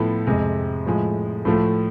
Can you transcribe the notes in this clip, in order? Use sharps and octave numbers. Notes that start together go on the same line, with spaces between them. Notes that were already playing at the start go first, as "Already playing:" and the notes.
Already playing: A2 F3 B3 E4 A4
F2 C3 G#3
A2 F3 G#3
A2 F3 A3